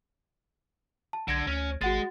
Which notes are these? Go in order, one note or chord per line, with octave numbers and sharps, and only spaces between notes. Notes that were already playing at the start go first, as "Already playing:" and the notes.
A5
B1 D3 G#6 A#6 D7
D2 C#4
G#1 G#3 F#4 F#5 A6